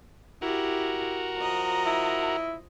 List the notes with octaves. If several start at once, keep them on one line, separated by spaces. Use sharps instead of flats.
E4 F#4 G4 A#4
F3 D#5 A#5
E4